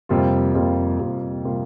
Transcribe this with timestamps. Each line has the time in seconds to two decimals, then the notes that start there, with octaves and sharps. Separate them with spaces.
0.09 F2 C3 G3 A#3 F4
0.55 F2 C3 G3 A#3 F4
0.99 F2 C3 G3 A#3 F4
1.44 C3 G3 A#3 F4